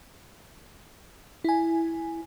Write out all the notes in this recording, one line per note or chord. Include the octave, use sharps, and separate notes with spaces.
E4 G#5